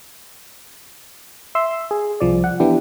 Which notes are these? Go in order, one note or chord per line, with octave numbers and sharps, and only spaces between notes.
E5 C6 E6
G#4
C2 F3 D5
F#5
E3 B3 D4 E4 G4